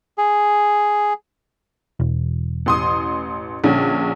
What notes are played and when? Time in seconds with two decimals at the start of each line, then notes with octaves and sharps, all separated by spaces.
0.18 G#4
2.00 E1
2.66 A1 C6 D#6
3.64 A#1 D3 C#4